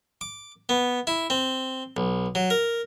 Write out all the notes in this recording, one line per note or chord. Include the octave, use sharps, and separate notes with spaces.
D6
B3
E4
C4
B1
F#3
A#4